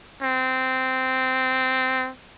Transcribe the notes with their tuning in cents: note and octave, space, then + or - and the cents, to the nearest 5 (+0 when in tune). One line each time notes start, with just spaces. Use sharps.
C4 -10